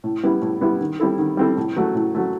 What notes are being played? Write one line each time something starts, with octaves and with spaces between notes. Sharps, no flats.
A2
G3 B3 E4
A2
G3 B3 E4
D#3
G3 C4 E4 A4
D#3
G3 C4 E4 A4
A2
F#3 A3
A2
F#3 A3